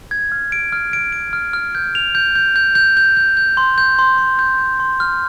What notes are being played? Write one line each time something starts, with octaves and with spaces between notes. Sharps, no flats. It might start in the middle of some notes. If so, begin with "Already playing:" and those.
G#6
F6
D7
F6
D7
D7
F6
F6
G6
F7
G6
G6
G6
G6
G6
G6
G6
C6
G6
C6
C6
G6
G6
C6
F6